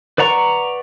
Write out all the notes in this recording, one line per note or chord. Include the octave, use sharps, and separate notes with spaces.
B4 D5 F#5 A#5 C#6